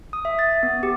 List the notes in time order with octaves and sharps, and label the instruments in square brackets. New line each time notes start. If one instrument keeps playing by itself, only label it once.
[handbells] D#6
E5
A6
B3
G4